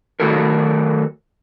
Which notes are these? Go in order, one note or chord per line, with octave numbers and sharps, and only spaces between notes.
D#3 F#3 A3 F#4 A4 A#4